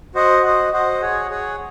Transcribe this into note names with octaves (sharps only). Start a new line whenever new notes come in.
F#4 C5 D#5 F#5
F#4 C5 D#5 F#5
F#4 C5 D#5 F#5
G#4 C#5 F#5
G#4 C#5 F#5